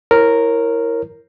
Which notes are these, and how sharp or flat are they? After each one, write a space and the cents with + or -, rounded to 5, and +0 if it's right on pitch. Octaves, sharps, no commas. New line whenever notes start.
E4 +0 A#4 -5 C#5 -25